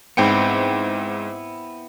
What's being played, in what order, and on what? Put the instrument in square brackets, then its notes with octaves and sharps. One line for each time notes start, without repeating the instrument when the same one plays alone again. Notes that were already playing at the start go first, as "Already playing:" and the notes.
[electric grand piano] G#2 G5 C#7 [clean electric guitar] B3 C4 E4